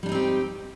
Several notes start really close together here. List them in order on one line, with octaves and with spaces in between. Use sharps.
G3 D4 D#4 C4 G4